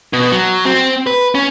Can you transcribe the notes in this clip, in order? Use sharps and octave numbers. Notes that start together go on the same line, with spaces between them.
B2
F#3
C4
B4
C#4